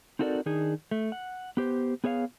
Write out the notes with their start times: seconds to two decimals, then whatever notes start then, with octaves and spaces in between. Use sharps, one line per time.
0.19 C4 D#4 F#4 A4 A#4 D5
0.46 D#3 D4 D#4 G#4
0.91 A3
1.12 F#5
1.57 B3 G4 C5
2.04 B3 G#4 C#5 E5 F5